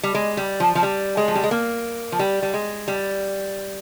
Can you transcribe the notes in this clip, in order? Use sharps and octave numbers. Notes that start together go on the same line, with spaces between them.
G3
G#3
G3
F3
F3
G3
G#3
F3
G3
G#3
A#3
F3
G3
G3
G#3
G3